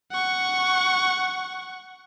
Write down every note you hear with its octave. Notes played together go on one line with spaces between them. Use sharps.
F#5 C#6